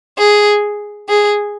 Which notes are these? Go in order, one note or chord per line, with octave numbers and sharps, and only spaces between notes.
G#4
G#4